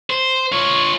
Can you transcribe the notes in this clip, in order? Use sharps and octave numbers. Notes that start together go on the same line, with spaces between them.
C5
F4 C#5